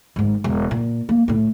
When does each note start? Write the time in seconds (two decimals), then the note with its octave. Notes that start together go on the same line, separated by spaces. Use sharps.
0.16 G#1 G#2
0.44 E1
0.71 A#2
1.09 A#3
1.28 A2 A3